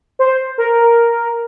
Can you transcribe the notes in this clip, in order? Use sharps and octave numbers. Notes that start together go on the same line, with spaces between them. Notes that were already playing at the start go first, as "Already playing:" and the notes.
C5
A#4